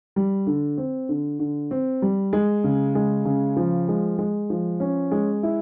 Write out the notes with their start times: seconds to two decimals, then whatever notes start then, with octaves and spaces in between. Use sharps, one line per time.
0.16 G3
0.47 D3
0.78 C4
1.09 D3
1.39 D3
1.71 C4
2.02 G3
2.33 G#3
2.64 C#3
2.95 G#3
3.25 C#3
3.56 F3
3.88 G#3
4.19 G#3
4.50 F3
4.80 C#4
5.12 G#3
5.43 E4